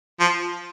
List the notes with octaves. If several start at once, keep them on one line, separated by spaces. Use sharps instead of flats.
F3